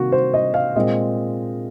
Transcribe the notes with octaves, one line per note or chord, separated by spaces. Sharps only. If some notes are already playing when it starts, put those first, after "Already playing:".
Already playing: C3 D#3 A#3 F#4
C5
D#5
F5
A#2 G#3 C4 D#5